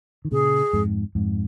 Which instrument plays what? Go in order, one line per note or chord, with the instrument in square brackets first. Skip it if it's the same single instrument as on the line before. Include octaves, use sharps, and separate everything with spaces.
[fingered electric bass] D#3
[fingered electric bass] A#2 C#3 [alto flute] G#4
[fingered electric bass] F2 G#2
F2 G#2